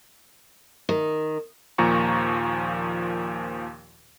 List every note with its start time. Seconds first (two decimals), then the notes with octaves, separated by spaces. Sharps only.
0.89 D#3
1.78 D#2 A#2 F3 A#5 C#6